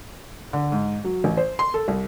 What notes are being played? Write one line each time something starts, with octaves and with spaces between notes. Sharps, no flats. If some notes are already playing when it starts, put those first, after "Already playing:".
D3
G#2
F#3
A1
C5
C6
A4
C2